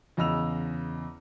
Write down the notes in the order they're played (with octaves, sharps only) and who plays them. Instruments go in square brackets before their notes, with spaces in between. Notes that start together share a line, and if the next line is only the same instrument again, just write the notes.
[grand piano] E2 C#3 D#5 E6 F7